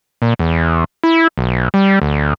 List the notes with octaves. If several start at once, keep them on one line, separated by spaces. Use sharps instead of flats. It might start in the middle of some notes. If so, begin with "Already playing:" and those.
A#2
E2
E4
B1
G3
D2